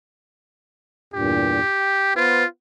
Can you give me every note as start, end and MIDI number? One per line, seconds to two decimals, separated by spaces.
1.14 1.60 40
1.14 1.60 43
1.14 1.60 46
1.14 2.11 67
1.79 2.13 79
2.16 2.43 59
2.16 2.45 65
2.16 2.43 71
2.16 2.43 72